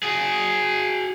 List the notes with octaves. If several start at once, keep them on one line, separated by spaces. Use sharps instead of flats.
F#4 G#4